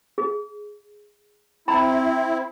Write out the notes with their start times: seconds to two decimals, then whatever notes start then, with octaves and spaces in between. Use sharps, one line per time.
0.18 G#4
1.68 C4 E4 A#5 B5